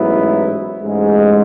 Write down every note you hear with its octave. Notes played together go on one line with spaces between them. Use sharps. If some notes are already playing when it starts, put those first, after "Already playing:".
Already playing: A1 G#2 F#3 B3 E4
A1 G#2 G#3